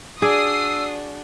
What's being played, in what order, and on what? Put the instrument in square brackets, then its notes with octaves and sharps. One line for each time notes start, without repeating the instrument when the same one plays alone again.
[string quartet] D4 F#4 [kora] G#4 D5 [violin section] D#6 C7 [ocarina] E6